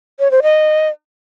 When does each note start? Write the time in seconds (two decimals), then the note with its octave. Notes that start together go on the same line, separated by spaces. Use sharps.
0.20 C#5
0.31 C5
0.43 D#5